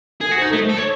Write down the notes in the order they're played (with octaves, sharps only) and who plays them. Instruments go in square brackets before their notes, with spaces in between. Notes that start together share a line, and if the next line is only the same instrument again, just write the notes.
[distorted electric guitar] G#4 [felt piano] A4
[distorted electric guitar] F#4
[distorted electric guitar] D#4 [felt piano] C5
[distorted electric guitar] A3 [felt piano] A4
[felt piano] C5
[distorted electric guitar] A4
C#5